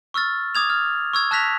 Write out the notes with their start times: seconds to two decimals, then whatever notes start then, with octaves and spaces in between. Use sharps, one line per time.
0.14 C#6 E6 F6 A6
0.55 D6 D#6 G#6 F7
0.70 F6
1.13 C#6 E6 G#6
1.31 A5 E6 F#6 A#6 B6 F7